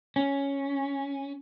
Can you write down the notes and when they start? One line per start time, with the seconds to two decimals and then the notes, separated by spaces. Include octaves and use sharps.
0.16 C#4